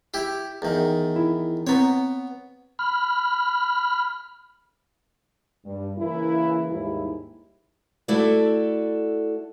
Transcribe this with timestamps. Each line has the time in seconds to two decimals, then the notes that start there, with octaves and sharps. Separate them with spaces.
0.14 E4 G4
0.62 E2 D#3
1.16 E4
1.67 B3 C4 C#5 A#5
2.79 B5 F6
5.65 G2
5.98 C#3 E3 A#3 E4
6.70 D#2 G#2 G3 E4
8.08 A3 E4 F#4 A4 D5